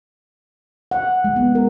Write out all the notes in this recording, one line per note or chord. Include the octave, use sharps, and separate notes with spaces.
F#5
G#3
B3
A#4